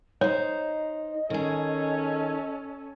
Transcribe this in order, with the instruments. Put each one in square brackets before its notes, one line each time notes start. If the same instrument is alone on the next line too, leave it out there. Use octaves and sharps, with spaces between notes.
[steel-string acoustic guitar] D#4 C5 [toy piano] C#5 [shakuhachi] D#5
[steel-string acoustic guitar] D#3 G#4 [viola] C#4 A4